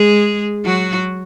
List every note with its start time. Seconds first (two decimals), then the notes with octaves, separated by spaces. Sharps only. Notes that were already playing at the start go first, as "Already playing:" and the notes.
Already playing: G#3 G#4
0.65 F#3 F#4